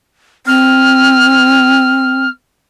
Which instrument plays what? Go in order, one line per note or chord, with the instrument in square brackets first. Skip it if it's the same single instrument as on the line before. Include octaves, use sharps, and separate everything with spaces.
[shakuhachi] C4 [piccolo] F6